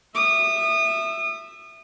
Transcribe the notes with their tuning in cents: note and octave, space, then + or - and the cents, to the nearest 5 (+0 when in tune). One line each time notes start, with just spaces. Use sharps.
E5 +0 D#6 -30